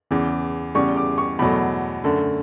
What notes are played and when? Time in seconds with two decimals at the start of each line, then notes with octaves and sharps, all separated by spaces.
0.11 E2 C#3 E3
0.75 E2 C#3 G3 C#6
0.96 D6
1.18 C#6
1.39 E2 B2 F#3 A3 B5
2.04 F#2 D3 A3